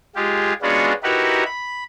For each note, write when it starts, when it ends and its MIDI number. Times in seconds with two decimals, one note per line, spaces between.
0.16 0.53 56
0.16 0.53 65
0.16 0.53 67
0.16 0.53 68
0.62 0.93 56
0.62 0.93 59
0.62 0.93 61
0.62 0.93 62
0.62 0.93 65
0.62 0.93 66
1.03 1.44 63
1.03 1.44 64
1.03 1.44 66
1.03 1.44 67
1.03 1.44 70
1.03 1.44 71
1.45 1.84 83